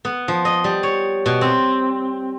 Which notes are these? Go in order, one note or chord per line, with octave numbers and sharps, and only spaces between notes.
B3
F3
D#5
G3
C#5
B2
C4